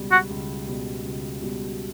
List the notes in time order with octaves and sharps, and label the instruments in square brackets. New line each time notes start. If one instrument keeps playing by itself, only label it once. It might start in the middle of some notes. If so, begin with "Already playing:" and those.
Already playing: [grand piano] C#2 B2 G3
[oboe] F#4
[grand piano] C#2
B2 G3
C#2
B2 G3